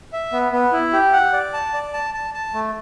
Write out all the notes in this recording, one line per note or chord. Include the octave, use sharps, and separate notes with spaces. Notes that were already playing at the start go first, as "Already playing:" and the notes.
E5
B3
B3
E4
G4
F#5
D5
A5
D5
A5
A5
A5
A3